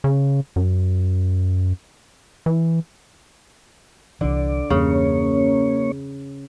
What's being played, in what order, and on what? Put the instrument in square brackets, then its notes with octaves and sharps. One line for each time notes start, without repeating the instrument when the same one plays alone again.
[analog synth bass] C#3
F#2
E3
[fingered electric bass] C2 E3 [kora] D3 [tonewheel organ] D5
[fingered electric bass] E2 G2 [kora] C#3 [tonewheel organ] A#3 C#4 C#5